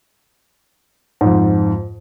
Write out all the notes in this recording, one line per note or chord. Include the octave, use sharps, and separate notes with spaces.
F2 G#2